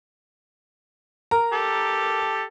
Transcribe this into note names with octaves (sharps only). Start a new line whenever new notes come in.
A#4 A#5
G4 A4